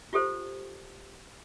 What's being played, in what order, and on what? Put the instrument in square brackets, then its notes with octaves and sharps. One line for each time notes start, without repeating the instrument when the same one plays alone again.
[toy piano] F4 G4 A4 C5